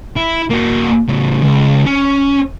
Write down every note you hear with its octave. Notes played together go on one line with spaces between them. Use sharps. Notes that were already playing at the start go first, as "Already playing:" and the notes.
E4
A#3 F#4
A2 C#3
C#2
C#4